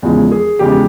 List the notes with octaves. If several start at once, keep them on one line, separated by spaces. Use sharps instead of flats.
E2 C#3 F3 G#3
G#4
E2 C#3 F3 G#3 G4